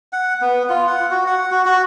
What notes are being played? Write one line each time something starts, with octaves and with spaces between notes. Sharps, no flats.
F#5
B3
F4
F#5
F#4
F#5
F#4
F#4